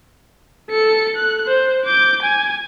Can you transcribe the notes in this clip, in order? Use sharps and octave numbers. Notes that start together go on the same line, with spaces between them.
A4 C#7
F#6
C5
D6 G6
G#5